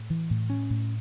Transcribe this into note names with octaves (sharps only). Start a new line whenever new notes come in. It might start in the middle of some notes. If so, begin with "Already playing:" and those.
Already playing: A2
E3
A2
C#4
A2